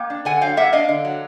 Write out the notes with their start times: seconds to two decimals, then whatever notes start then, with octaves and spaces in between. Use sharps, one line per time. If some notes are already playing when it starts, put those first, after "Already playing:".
Already playing: A#3 G5
0.10 D4
0.25 D3 F#5 G#5
0.41 F#3 F5 G5
0.57 A#3 E5 F#5
0.73 D4 D#5 F5
0.89 D3
1.05 F#3